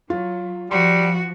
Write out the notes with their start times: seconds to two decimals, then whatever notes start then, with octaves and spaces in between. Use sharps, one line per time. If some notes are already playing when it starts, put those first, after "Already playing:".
0.10 F#3 F4
0.71 F3 G3 F#4 C6